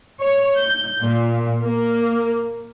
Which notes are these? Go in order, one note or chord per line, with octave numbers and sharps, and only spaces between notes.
C#5
G6
A#2
A#3